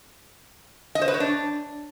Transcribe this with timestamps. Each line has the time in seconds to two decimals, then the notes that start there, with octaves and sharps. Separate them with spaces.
0.95 D#5
1.01 C5
1.08 B4
1.14 C#5
1.20 D4